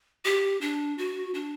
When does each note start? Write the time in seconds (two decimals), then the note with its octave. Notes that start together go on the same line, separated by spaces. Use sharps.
0.25 G4
0.61 D4
0.98 F#4
1.34 D4